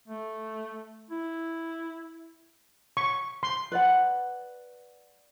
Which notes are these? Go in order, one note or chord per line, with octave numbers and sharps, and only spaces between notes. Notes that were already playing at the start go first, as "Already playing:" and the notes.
A3
E4
C#6
C6
B4 D5 F#5